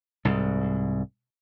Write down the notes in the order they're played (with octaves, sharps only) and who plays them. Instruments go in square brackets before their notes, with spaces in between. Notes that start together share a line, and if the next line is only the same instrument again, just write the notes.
[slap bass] C2 G#2